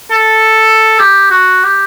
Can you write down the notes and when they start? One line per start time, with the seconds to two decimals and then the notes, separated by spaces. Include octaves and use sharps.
0.11 A4
0.99 G4
1.31 F#4
1.64 G4